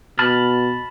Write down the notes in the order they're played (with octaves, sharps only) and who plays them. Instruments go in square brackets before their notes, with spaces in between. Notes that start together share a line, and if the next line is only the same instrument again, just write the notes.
[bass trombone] B2 [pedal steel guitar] A5 B5 F6